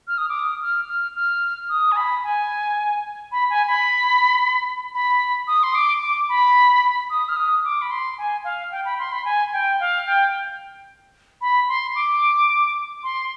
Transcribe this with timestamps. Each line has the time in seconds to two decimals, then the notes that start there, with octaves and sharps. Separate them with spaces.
0.08 F6
0.18 D#6
0.29 D6
0.39 D#6
0.62 F6
0.89 F6
1.16 F6
1.69 D#6
1.92 G#5
1.97 B5
2.23 G#5
3.32 B5
3.50 G#5
3.67 B5
4.94 B5
5.47 D#6
5.63 C6
5.75 D6
6.01 D6
6.29 B5
7.10 D#6
7.29 F6
7.36 D#6
7.64 D6
7.82 B5
7.91 C6
8.18 G#5
8.44 F5
8.72 G5
8.85 B5
8.99 C6
9.12 B5
9.25 G#5
9.53 G5
9.80 F5
10.06 G5
11.41 B5
11.69 C6
11.96 D6
13.03 C6